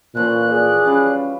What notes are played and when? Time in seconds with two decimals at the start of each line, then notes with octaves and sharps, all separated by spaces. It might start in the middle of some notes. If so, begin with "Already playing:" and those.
0.15 A#2 E3 F3 C#4 F#6
0.51 G#4 D5
0.87 G3 C#4 B4 F5